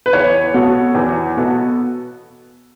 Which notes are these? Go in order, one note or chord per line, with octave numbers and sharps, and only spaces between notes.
B4
E2 C#5
B2 B3 F#4 A4
E2
B2 B3 F#4 A4